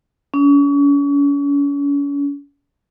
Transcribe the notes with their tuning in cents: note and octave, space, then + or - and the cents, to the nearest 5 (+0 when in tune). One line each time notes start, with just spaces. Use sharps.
C#4 +40